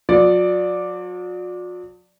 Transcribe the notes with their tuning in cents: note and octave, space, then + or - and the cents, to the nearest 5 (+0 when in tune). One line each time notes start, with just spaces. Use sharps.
F#3 -45 D5 +0